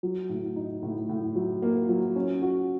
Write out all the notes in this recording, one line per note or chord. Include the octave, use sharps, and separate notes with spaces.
F#3
A2
D#4
A2
A2
F#3
A#3
F#3
C#4
F#4